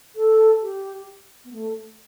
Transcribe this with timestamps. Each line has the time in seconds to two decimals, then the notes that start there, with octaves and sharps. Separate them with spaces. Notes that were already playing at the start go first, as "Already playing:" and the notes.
0.16 A4
0.62 G4
1.44 B3
1.52 A3